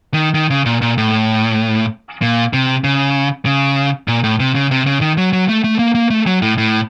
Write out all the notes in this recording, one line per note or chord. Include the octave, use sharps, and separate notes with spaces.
D#3
D#3
C#3
A#2
A#2
A2
A#2
C3
C#3
C#3
A#2
A2
C3
C#3
C3
C#3
D#3
F#3
F#3
A3
A3
A#3
A#3
A3
F#3
A2
A2